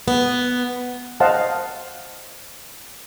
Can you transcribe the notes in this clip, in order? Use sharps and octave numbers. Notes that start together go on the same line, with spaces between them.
B3
C5 D#5 F5 F#5 A5